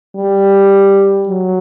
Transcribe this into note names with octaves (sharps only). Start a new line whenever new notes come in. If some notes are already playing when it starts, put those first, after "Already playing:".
G3
F#3